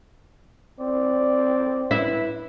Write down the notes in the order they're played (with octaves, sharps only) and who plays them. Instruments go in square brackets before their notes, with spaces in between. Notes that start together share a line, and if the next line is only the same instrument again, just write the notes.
[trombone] C4 [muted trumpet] D5
[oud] E4 [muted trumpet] B4